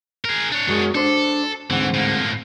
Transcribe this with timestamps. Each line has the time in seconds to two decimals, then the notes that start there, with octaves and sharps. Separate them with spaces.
0.25 G#4 A#4
0.52 D4 C#5
0.67 F#2 F#3 G#3
0.95 D4 A4 C5
1.70 D2 G#2 E3 C4
1.94 A2 A#3